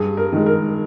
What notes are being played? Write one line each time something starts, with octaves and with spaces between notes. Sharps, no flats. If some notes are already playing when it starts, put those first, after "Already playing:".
Already playing: G2 G#4
A#4
D#3 G#3
A#4